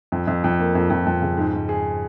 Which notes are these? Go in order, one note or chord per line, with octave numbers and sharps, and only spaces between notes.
F2
F2
F2
A#3
F2
F2
F2
C#3
G#2
G#2
G#4